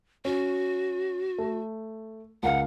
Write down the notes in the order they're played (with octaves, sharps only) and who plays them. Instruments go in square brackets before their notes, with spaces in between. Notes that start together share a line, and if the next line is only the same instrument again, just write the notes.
[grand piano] C#4 [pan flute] F#4
[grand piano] A3
[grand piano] C#2 A#4 F5 [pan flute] F#5